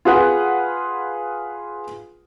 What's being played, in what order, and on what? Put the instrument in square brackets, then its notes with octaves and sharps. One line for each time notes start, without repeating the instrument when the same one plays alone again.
[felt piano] F4 G#4 B4 F#5